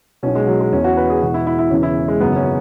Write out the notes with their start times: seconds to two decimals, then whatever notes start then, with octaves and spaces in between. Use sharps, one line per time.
0.23 B1 B2 C#4
0.35 G#3
0.47 F#3
0.60 G#3
0.72 E1 E2 E3 C#4
0.84 F#4
0.97 B4
1.10 G#4
1.22 E1 E2 B2 F#4
1.34 E4
1.47 E4
1.59 E4
1.70 E1 E2 C#3 E3 C#4
1.83 E4
2.08 G#3
2.20 G#1 F#2 C#3 B3
2.36 C#4